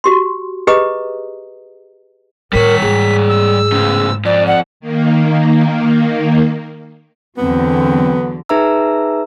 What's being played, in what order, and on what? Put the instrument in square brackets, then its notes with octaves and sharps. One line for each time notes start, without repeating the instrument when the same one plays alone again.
[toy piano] F#4 G4 C6
G4 G#4 B4 D#5 A#5 D#6
[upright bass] A2 D#3 [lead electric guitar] G3 C#5 [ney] A#4 [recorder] B6
[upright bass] G#2 [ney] G#4
[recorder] E6
[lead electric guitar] A2 C#3
[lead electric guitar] F2 [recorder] D5
[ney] D5 [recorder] F#5
[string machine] D#3 A#3
[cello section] E2 D3 F#3 [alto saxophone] B3 [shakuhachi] C4
[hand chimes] D#4 G#4 B4 E5 A#5 E6